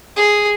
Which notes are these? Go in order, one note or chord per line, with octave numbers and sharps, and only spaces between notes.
G#4